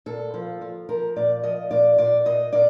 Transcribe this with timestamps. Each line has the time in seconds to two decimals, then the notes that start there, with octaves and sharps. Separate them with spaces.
0.06 A#2 A4
0.34 F3
0.61 F3
0.89 F3 A#4
1.16 A#2 D5
1.43 F3 D#5
1.70 A#2 D5
1.98 A#2 D5
2.25 A#2 D#5
2.53 A#2 D5